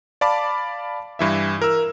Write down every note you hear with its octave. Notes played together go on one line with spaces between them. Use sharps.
D5 F5 A5 B5 D6
G2 E3 E5
A#4 E6